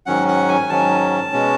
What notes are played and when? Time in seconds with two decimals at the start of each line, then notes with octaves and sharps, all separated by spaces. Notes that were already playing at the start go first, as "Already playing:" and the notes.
0.06 G#2 D#3 F#3 C#4 F#5
0.28 F#5
0.48 G#5
0.69 G#2 D#3 F#3 C#4 A5
1.32 B2 G#3 C#4